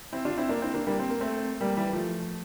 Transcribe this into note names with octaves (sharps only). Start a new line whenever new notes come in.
C4 E4
D4 F4
C4 E4
A#3 D4
C4 E4
A#3 D4
G3 A#3
C4
A#3
A3 C4
G3 A#3
E3 G3
F3 A3